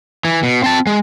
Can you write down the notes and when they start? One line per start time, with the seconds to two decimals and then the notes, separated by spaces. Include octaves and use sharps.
0.25 E3
0.43 B2
0.64 C4 A5
0.87 G#3